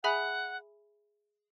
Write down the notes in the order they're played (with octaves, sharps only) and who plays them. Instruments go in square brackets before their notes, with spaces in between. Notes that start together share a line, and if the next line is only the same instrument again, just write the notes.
[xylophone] G#4 E5 G#5 B5 [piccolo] F#5